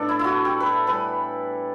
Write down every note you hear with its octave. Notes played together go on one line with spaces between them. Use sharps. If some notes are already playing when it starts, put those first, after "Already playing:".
Already playing: A2 B3 D4 A4
E4
E4 F#4
G4
B4
A4
A2 E3 G3 B4